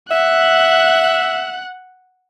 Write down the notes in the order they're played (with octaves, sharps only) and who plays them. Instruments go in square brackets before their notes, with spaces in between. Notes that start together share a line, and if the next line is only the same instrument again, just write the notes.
[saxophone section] E5 [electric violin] F#5 F#6